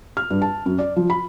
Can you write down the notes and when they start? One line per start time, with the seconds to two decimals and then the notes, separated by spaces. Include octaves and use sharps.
0.17 F6
0.30 G2
0.42 A5
0.66 F#2
0.79 D5
0.96 F3
1.10 B5